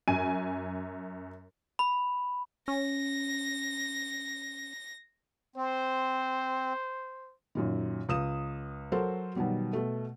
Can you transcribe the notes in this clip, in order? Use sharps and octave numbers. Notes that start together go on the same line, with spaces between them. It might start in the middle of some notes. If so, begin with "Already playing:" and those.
F#2 G#5 D#7
B5
C#4 A#6
C4 C5
F#2 A#2 D#3
C#2 D#6 E7
F#3 F#4 A4 A#4 C5
B2 D#3 F#3 G3
B2 A3